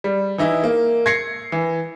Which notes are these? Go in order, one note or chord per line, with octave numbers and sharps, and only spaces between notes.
G3
E3 D#4 E4
A#3
G#6 A#6 C7 C#7
E3